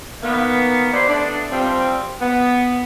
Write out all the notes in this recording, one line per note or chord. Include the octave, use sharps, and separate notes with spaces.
D#3 A#3 B3
E4 G4 B4 C5 D5
A3 B3 D4
F3 G3 C4
B3